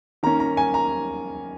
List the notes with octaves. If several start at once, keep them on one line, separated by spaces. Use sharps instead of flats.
D#3 A#3 C#4 A#5
A#5
G#5
A#5